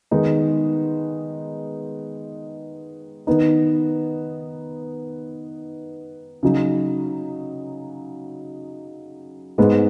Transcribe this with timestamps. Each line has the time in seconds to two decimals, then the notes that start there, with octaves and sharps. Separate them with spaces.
0.11 D#3 G#3 B3 D#4
3.27 D#3 B3 D#4
6.43 C#3 F#3 D#4
9.58 G#2 G#3 B3